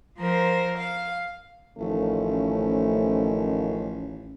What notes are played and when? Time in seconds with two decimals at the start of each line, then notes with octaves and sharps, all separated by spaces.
0.18 F3 A#4 C5
0.77 F5
1.78 A1 D#3 F3 A3 C#4